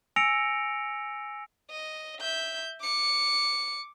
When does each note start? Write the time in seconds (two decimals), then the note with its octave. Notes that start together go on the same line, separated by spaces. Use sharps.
0.16 G#5 E6 A#6 C#7 D7 F7
1.70 D#5
2.21 E5 G6
2.81 D6 C#7